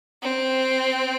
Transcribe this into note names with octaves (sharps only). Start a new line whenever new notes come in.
C4